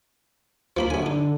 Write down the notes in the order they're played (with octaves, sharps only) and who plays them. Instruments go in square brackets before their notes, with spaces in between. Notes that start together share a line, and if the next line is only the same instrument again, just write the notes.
[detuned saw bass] D#2 [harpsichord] F3 A#3 B5
[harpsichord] F#2 G#5 [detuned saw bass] D3
[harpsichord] D#4